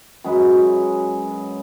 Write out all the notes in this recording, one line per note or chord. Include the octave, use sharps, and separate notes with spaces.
F#2 F#3 G#3 B4